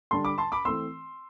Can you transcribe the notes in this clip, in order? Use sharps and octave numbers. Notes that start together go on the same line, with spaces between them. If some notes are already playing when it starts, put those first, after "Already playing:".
D3 G3 D4 A5 C6
B5 D6
A5 C6
B5 D6
E3 A3 C4 C6 E6